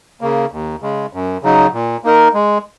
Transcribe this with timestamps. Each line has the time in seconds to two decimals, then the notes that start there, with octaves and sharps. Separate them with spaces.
0.21 C#3 A#3
0.52 D#2
0.82 C#3 G#3
1.13 F#2
1.43 C#3 F#3 D#4
1.73 A#2
2.04 A#3 D#4 A#4
2.34 G#3